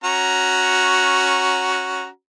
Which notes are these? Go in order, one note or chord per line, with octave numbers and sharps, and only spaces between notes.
C#4 F#4 A#5